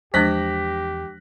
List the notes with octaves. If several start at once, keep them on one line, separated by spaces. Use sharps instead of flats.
E2 F3 G#3 D4 G4 F#6 A#6 B6